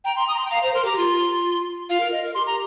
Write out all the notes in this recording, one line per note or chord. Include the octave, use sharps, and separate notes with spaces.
G5 A#5
C6
A#5
D#6
A#5
C6
G5
F5 A#5
C5 A#5
A#4 C6
G4 A#5
F4 C6
F4 F5
A#4
D#5
A#4
G4 C6
A#5